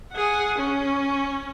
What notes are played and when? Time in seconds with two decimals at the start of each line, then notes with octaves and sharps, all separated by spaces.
0.12 G#4 F#5
0.58 C#4